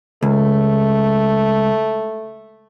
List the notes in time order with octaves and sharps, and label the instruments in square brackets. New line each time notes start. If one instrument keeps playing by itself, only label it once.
[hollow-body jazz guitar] C#2 [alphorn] A3